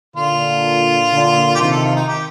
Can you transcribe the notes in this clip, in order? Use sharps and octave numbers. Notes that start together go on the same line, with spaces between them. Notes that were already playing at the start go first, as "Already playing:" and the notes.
A#2 D3 F4
A#2 D3
G4
C3 D#3 F4
A4
F4
D#4
G4